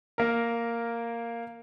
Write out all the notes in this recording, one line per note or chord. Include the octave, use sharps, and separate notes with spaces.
A#3 A#4